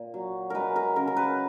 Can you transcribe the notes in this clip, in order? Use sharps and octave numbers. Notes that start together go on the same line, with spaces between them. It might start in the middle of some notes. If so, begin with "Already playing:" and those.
Already playing: A#2
F#3
G#3 A#4 B4
A#4
C#3 A#4
A#4
B4